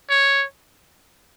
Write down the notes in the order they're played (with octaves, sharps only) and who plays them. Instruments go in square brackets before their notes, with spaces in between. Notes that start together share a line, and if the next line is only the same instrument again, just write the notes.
[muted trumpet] C#5